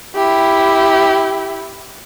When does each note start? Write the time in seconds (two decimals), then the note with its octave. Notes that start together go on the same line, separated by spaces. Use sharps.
0.16 E4 G4